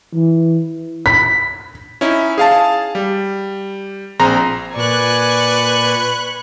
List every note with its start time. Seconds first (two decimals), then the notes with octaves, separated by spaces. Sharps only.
0.14 E3
1.06 B6
2.01 C#4 D#4 E4
2.38 G#4 F5 A5
2.95 G3
4.19 A#1 C4 G#4 A#5 C6 A#6
4.76 A#2 B4 D5 G#5 C#6 F#6